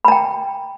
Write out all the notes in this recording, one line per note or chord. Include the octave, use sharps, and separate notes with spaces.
G5 A#5 B5